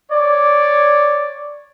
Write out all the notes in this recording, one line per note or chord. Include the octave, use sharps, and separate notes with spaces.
C#5 D5